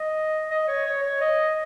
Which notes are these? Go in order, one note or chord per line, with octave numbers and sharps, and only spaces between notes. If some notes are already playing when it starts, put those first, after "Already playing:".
Already playing: D#5
D#5
C#5
C#5
C#5
D#5